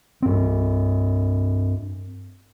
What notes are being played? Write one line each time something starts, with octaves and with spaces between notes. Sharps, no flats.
G2 C4